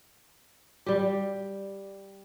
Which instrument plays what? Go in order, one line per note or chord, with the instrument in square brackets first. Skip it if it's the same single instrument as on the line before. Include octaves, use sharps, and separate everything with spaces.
[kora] G3 G4